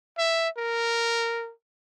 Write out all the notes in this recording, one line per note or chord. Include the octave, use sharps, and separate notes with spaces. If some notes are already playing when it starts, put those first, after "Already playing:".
E5
A#4